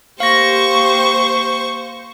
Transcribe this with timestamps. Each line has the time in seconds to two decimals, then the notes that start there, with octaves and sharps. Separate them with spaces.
0.20 A#3 G4 C5 F5 C#6 A#6